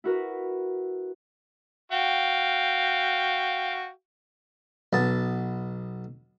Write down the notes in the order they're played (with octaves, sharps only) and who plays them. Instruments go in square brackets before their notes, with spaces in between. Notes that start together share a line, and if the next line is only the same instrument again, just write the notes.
[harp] E4 F#4 A#4 B4
[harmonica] F#4 F5 G5
[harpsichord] B1 B3 A5